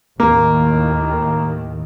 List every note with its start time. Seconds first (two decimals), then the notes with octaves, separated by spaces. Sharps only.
0.20 D#2 A2 D#3 A#3